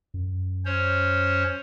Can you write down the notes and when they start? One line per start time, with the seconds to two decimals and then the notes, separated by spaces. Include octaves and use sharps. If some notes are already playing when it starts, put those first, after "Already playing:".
0.14 F#2
0.65 C#4 C5 C#5